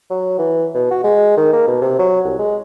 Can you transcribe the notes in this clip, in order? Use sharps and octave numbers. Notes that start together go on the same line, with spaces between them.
F#3
E3
B2
F#4
G#3
D#3
A#3
B2
C3
F#3
C2
G#3